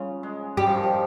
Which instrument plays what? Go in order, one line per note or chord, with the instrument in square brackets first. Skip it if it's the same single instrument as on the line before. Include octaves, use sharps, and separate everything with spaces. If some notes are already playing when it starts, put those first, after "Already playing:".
Already playing: [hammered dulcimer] C#3 [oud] F4
[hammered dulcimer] G#3
[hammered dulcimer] G3 [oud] G4
[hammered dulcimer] F3
D#3
F3